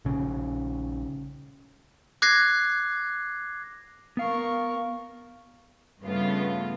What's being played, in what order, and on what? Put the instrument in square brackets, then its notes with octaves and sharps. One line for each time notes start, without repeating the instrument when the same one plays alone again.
[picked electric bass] A#1 C#3
[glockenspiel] D6 F#6 G#6 A#6 C7
[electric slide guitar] B3 F5 [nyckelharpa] A#4 C#6
[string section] G2 C#3 A3 B3 F4